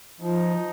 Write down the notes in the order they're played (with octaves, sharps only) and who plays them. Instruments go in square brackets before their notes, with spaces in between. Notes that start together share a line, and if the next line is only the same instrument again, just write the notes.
[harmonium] F3 [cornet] D#4